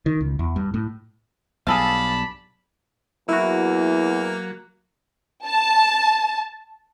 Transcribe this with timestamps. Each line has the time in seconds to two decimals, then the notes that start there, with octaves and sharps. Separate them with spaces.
0.06 D#3
0.21 C#2
0.39 E2
0.56 G2
0.74 A2
1.67 B1 G2 G#4 A4 D5 F5 A5 B5
3.29 E2 F#3 A#3 E4 F#4
5.47 A5